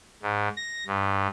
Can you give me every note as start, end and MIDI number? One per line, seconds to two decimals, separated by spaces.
0.22 0.49 44
0.57 0.84 94
0.87 1.27 43